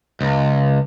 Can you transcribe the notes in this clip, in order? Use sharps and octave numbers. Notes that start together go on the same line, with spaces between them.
C#2